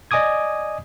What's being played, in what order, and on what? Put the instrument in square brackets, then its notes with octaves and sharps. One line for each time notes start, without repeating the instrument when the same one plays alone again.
[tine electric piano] D5 D#5 G#5 D6 D#6 G#6